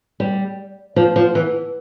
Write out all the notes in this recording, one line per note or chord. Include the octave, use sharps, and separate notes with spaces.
G3
F3
F3
E3